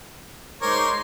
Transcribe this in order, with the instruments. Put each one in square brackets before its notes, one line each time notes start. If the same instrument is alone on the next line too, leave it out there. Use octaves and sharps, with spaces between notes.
[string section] G#3 D#4 C6 [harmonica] A#4 C#5 [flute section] C5 D6